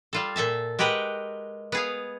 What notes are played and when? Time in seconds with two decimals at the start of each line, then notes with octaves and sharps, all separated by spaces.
0.13 G3 F4 A4
0.36 A#2 A4 E5 A5
0.79 G#3 G4 A#4 B4 F#5 G5
1.72 B3 G#4 F5